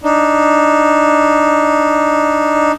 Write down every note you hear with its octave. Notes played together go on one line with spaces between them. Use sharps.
D4 D#4